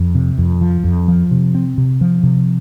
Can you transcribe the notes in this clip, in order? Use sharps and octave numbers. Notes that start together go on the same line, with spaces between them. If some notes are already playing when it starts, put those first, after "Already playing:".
Already playing: F2
C3
F2
F3
F2
F3
C3
C4
C3
F3
C3